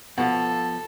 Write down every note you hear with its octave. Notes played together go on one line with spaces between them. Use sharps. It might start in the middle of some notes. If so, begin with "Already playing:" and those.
B2 F3 A4 F#5